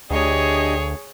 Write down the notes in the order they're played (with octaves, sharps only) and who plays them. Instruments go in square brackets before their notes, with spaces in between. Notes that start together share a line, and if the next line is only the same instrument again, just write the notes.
[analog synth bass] D2 [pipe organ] D4 G4 D#5 [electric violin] G#4 C#5